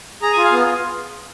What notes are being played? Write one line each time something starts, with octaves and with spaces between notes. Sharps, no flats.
G#4 A#5
F4 G#5
F5
B3